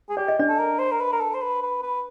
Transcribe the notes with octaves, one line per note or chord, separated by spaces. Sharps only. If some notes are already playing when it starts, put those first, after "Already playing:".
G#4
G4 D5
D#5
D4 D5
A4
A#4
C5
A#4
B4
A#4
A4
C5
B4
B4
B4